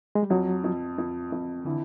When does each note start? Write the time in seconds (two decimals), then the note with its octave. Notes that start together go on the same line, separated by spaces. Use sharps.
0.15 G#3
0.23 G3
0.30 F2 F#3
0.64 F2
0.98 F2
1.32 F2
1.65 D3 E3